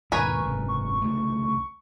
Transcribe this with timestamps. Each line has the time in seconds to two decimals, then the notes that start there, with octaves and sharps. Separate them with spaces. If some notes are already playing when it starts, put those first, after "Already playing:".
0.12 D#2 G#2 B2 A#4 B4 G#5 C#6
0.42 F#1 G#2 C3
0.68 C#6
1.02 C2 C#3 A3